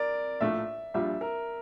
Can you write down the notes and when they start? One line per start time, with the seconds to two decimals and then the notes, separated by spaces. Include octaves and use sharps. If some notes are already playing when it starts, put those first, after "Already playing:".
Already playing: A#4 D5
0.41 A#1 A2 F3 A3 E5
0.94 A#1 A#2 G3 D4 F4 E5
1.21 A#4